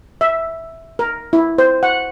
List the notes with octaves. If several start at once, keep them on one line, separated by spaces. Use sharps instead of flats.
E5
A#4
E4
C5
F#5